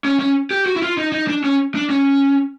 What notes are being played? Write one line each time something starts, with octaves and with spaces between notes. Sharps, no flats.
C#4
C#4
G4
F#4
E4
F4
D#4
D#4
D4
C#4
D4
C#4